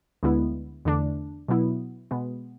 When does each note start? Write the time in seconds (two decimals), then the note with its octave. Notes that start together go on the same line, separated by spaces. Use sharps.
0.23 D2 D3 G#3 B3 E4
0.85 E2 D3 A3 D4
1.48 B2 F#3 B3 E4
2.11 B2 G#3 B3